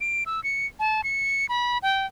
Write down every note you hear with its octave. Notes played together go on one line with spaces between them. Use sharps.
D7
E6
C#7
A5
C#7
B5
G5